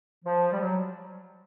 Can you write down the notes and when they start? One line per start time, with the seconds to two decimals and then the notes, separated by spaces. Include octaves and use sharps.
0.25 F3
0.52 G3
0.60 F#3